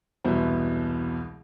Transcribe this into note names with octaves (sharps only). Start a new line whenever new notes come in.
E1 C2 B2 B3 E4 C5